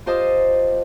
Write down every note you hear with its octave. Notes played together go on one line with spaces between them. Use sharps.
F4 G4 C5 D#5 A5 D#6